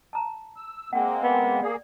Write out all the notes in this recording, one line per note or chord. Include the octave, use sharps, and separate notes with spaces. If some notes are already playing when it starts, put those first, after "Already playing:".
A5 A#5
E6
G#3 A#3 C4 F#5 G5
B3
A#3 G#4 D5